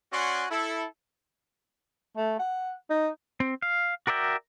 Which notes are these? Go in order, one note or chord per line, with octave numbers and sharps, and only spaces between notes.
C#4 F#4 D5 F#5 G#5 C6
E4 A4
A3
F#5
D#4
C4
F5
F#4 A#4 D5 E5 G5